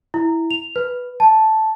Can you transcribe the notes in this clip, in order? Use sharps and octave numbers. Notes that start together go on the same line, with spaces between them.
E4
F7
B4
A5